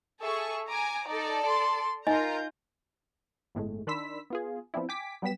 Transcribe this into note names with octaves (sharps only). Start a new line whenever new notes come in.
G#4 A4 E5 C#6
G#5 A#5 D6
D#4 A4 D5
C6
D#4 F4 A#4 D#5 G#5 A#5 G6
G1 A2 G#3 A3
D#3 D4 B5 C6 E6 B6
B3 F4 G#4
F3 B3 C4 D4 E4
G5 G#5 D6 B6
F#3 G3 B3 G5 B6 E7